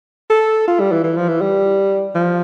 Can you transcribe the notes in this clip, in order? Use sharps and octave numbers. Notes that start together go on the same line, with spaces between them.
A4
F4
G3
E3
E3
F3
E3
G3
F3